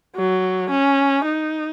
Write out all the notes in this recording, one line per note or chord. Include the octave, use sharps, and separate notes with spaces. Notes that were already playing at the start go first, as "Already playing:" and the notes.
F#3
C#4
D#4